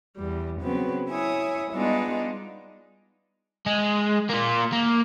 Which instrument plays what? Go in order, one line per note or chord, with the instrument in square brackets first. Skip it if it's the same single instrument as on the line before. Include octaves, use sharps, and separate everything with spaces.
[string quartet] E2 G3
C#3 F#3 B3 C4
E4 C#5 E5 G#5 D#6
G3 G#3 B3 D4 D#4 F4
[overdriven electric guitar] G#3
A#3 F4
A#3